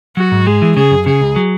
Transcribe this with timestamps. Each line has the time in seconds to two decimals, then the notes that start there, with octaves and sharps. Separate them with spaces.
0.17 F#3 F#4
0.32 G#2
0.47 G#3 G#4
0.62 E3
0.76 C#3 G#4
0.91 F#2
1.06 C#3 G#4
1.21 C#2
1.36 F#3